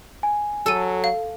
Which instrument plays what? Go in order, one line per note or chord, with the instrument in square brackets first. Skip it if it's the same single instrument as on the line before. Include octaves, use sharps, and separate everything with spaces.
[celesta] G#5
[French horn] F#3 [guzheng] A4 [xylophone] E6 D#7
[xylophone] F5